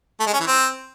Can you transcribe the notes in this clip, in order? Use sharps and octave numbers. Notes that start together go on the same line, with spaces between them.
A3
G#3
C#4
E3
C4